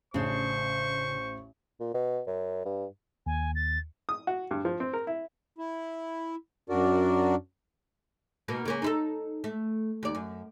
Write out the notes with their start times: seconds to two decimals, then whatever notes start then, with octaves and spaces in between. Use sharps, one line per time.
0.14 A1 C#3 D4 C5 C#6
1.80 A#2
1.94 B2
2.27 F#2
2.65 G2
3.26 D#2 G#5
3.55 A6
4.09 D#6
4.27 F#4
4.51 G2
4.65 F3
4.80 C4
4.93 A#4
5.07 E4
5.58 E4
6.69 F#2 D4 F#4 A#4 D5
8.48 B2 A#3 D#4
8.65 C#3 A#3 C#4
8.82 D#4 E4 A4
9.44 A3
10.03 D#2 D5
10.15 F#2